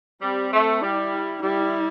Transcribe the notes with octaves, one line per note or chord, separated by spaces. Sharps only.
G3 C4
A3
G3 E4
G3 E4